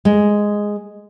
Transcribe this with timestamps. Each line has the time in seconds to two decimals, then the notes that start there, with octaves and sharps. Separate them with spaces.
0.05 G#3